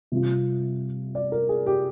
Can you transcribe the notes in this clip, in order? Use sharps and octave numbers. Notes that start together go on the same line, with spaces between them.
C3 G3 C4 F4
D5
A#4
G#4
G4